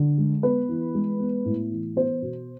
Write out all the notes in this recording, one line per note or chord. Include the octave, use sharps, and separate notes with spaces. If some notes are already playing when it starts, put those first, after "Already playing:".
Already playing: D3
G#3
B3 B4
E3
G#3
B3
A2
E3
B3 C5
B2